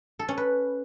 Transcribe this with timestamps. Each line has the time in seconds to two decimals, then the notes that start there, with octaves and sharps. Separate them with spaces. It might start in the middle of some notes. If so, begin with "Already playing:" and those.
0.19 A4
0.28 C#4
0.37 B4